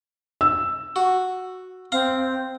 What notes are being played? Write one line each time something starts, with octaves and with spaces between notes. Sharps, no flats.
E6
F#4
C4 F5 A#5